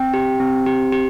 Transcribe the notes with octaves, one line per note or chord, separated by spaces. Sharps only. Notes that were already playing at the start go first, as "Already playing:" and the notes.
Already playing: C4 G5
G4
C4
G4
G4